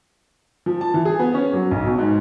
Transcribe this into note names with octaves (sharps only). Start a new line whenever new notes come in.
F3
A5
E3
G#4
B3
C#4
F#3
B1
B2
G#2